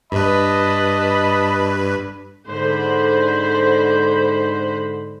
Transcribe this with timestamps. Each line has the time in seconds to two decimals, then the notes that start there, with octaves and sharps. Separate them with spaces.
0.12 G2 B4 D#5 A5 B5
2.48 G#2 D3 C5 B5